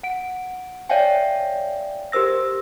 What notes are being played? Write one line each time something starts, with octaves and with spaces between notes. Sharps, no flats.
F#5 D7
C#5 D5 E5 F5 G5 G#5
G4 A#4 C5 E6 A#6